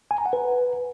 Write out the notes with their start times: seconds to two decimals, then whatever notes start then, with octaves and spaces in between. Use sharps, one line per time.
0.11 G#5
0.18 A#5
0.26 F#5
0.33 B4